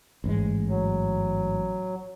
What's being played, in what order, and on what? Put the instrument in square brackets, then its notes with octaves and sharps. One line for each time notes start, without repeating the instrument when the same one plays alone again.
[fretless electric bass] A1 G#2 G#3
[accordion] F#3